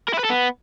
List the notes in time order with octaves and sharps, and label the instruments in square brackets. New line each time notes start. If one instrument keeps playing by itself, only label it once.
[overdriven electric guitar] A#4
E4
B4
A4
B3